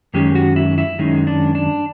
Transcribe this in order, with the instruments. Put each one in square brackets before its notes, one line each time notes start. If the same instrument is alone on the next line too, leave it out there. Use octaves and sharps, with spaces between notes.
[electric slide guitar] F#2 D#3 G#3 C#4 G4
F#4
E4
E4
F#2 D#3 G#3 C#4 D#4
D4
D4